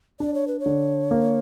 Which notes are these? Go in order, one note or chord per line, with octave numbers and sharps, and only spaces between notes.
D4 D5
C#5
B4
C#5
D3
A#3